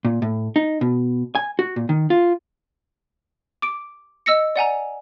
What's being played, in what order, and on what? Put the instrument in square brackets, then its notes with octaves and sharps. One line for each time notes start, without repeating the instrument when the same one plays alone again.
[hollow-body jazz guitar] A#2
A2
D#4
B2
G#5
F#4
A#2
D#3
F4
[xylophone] D6 D7
D#5 E6 A#6 C#7
D5 F#5 G#5 A#5